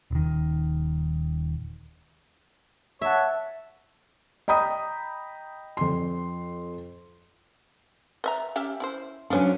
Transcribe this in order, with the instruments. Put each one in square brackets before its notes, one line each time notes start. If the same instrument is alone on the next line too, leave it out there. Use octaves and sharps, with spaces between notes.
[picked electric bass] D#1 D#3
[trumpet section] C#5 F#5 A5 [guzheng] E5
[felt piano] D#5 G5 A#5 B5 D#6
F2 C6
[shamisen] B4 E5 A#5
C#4 G4 E5
C#4 E4 C5
[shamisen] F3 B4 G#5 [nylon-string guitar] F#3 C#4 D4